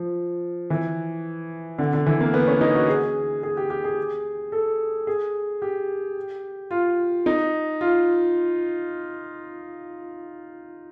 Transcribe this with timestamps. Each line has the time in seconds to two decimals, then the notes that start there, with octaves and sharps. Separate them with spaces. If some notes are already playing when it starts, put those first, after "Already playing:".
Already playing: F3
0.70 E3
1.78 D3
1.93 D3
2.06 E3
2.20 A#3
2.34 B3
2.48 C#4
2.61 D#4
2.75 F#4
2.88 G#4
3.43 G#4
3.57 G4
3.70 G4
3.84 G#4
4.52 A4
5.07 G#4
5.62 G4
6.71 F4
7.26 D#4
7.81 F4